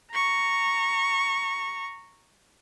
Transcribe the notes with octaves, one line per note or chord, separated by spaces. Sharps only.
A#5 C#6